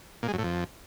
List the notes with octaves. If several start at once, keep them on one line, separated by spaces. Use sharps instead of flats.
A#2
G#3
F#2
A2
F2